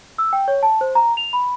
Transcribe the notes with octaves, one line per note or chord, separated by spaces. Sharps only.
E6
G5
C#5
A5
C5
A#5
F7
B5